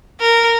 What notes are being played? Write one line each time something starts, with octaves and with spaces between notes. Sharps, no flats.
A#4